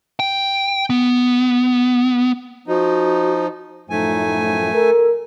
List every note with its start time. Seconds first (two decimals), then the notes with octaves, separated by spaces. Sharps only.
0.20 G5
0.90 B3
2.68 F3 D#4 F#4
3.90 F#2 A2 F3 A3 D#4 G#5
4.74 A4 A#4